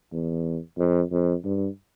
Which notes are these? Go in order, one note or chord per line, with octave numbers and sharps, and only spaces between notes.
E2
F2
F2
G2